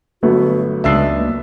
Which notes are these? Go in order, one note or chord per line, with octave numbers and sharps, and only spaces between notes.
G1 F#3 A3 B3 F#4
C#2 G#3 D4 D#5 E5 E6 C7
A#3